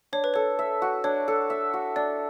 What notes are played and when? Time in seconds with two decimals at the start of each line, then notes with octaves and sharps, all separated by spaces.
0.13 D4 C#5
0.24 B4
0.34 A4 C#5
0.59 E5
0.82 F#4
1.04 D4 C#5
1.28 A4
1.50 E5
1.74 F#4
1.96 D4 D5